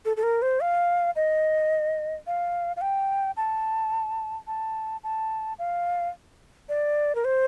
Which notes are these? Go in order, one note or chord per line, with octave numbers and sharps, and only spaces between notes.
A4
A4
A#4
C5
F5
D#5
F5
F5
G5
A5
A5
A5
F5
D5
A#4
C5